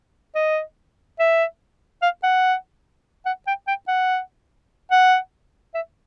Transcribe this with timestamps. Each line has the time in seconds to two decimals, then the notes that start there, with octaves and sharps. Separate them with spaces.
0.35 D#5
1.19 E5
2.02 F5
2.23 F#5
3.26 F#5
3.47 G5
3.67 G5
3.88 F#5
4.91 F#5
5.74 E5